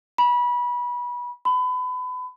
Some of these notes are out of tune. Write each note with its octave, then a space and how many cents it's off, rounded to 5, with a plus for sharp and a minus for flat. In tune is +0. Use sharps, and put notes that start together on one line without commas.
B5 -25
B5 +30